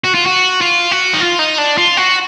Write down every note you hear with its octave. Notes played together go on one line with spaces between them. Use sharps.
F#4
F4
F#4
F4
F#4
D#4
F4
D#4
D4
F4
F#4